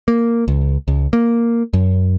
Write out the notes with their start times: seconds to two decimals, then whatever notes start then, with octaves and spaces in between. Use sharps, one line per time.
0.08 A#3
0.48 C#2
0.88 C#2
1.13 A#3
1.73 F#2